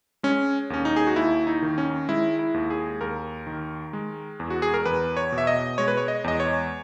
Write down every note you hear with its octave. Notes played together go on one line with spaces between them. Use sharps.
G#3 C#4
D#2 C#4
D#4
G#4
F#4
D#2 E4
D#4
D#3
C#4
G#3 E4
E4
D#2
G#4
D#2 A#4
D#3
G#3
E2
F#4
G#4
A#4
E2 B4
C#5
B2
E5
D#5
G#3 C#5
B4
C#5
D#5
E2 D#5
C#5